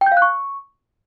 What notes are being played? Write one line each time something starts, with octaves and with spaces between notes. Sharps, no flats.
G5
G6
F5
F#6
C#6